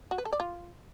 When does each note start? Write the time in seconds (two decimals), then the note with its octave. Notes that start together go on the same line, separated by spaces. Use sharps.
0.11 F#4
0.18 B4
0.25 A4
0.33 D5
0.40 F4